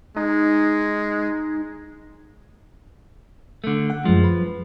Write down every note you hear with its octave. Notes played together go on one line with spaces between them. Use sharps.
G#3 D#4
D3 A3
F#5
F#2 F3 G#3
B4